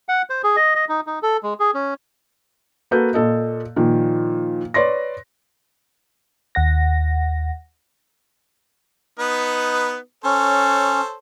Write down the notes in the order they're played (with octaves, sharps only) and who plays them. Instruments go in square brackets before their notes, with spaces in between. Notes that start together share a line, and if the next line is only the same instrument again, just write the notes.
[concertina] F#5
C5
G#4
D#5
D#5
D#4
D#4
A4
G#3
G#4
C#4
[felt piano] A#3 F#4 A4 B4 G6
A#2 A4 D#5
A#2 D#3 F3
B4 C#5 D5 C6 A#6
[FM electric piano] D#2 F#5 A#6
[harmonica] B3 D#4 B4
[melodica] C#4 [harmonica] A4 C5 C#5